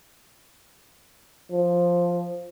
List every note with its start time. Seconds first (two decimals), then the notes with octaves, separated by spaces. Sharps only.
1.52 F3